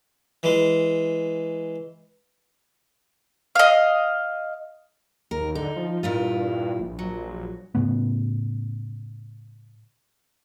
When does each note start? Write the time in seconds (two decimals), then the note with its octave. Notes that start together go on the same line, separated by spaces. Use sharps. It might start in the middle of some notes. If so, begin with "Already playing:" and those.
0.43 E3 G#3
3.55 D#5 F5
5.31 D#2 A#4
5.55 D3 D#4
5.76 F3
6.03 G2 A#2 E4 F4
6.79 A#1
6.99 F#3
7.75 A2 C#3 A3 B3